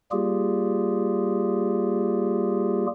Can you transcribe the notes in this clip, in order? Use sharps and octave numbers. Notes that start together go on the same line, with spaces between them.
G3 A#3 F4 G4 G#4